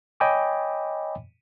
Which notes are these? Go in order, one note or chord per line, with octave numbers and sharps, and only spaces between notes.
C#5 D#5 G5 G#5 B5 D6